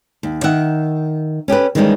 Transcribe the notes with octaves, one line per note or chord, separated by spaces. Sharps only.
D#2
D#3 E5 F#5
C#4 G4 A4 B4
D#3 E3 G3 G#3 A#3 C#4